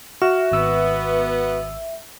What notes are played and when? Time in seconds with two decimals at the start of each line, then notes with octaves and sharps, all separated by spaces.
0.22 F#4 E5 F6
0.52 G#1 B3 E6